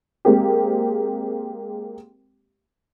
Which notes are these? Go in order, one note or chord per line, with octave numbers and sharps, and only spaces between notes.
G#3 A#3 C4 G4